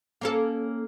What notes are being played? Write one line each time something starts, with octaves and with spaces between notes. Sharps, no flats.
A#3 C#4 A4